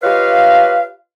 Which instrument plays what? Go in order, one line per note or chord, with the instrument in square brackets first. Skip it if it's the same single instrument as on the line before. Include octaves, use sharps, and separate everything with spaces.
[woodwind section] F4 G4 B4 C#5 D#5 F5